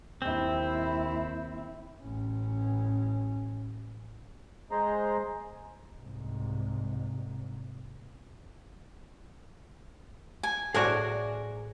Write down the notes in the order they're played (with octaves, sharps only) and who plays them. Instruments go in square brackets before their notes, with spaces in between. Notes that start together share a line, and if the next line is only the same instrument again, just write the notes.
[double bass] D#2 E4 [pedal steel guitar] C4
[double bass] A1 C#4
[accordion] G#3 G#4 C5 A#5 C6
[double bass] C2 G#2
[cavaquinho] G#5
[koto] A2 D4 F#4 [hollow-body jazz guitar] G#4 C5 D5 [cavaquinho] A#4 G#5